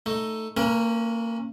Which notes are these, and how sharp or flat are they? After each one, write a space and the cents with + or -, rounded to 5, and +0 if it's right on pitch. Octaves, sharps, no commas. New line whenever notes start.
A3 +5 D#4 +0
A#3 -30 C#4 -25 A#4 +40